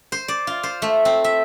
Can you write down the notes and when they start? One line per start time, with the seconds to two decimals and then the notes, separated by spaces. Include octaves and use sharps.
0.12 C5
0.28 D5
0.47 F4
0.63 C5
0.82 A3
1.05 C4
1.24 E5